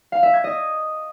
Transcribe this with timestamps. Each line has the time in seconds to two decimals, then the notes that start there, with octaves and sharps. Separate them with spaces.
0.12 F5
0.23 E5
0.33 G#6
0.44 D#5